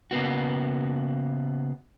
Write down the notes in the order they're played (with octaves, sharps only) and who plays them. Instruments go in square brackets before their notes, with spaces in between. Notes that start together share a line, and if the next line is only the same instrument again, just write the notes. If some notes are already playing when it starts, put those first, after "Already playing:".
[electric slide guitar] C#3 A#3 B3 F#4